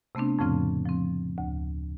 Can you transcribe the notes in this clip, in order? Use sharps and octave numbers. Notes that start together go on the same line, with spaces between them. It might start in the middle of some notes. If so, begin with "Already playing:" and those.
C3 A3 B3 C4 D4
F2 A2 C#3 F3 C4 F6
F3 C4
D2